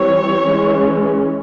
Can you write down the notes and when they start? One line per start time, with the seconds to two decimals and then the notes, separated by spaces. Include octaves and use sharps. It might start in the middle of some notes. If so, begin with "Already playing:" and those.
Already playing: E3 G3 C4 C#5
0.46 E3 G#3 C#4